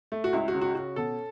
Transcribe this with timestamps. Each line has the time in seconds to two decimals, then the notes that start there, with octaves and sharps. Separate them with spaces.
0.12 A3
0.24 F#4
0.33 C#2 E4
0.48 F#4
0.54 C#3
0.61 F#4
0.75 C#4 F#4
0.96 B2 A4